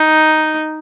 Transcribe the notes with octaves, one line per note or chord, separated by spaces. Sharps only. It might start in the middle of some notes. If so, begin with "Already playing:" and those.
Already playing: D#4